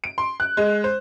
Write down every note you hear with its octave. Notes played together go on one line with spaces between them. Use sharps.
D7
C6
F#6
G#3
C5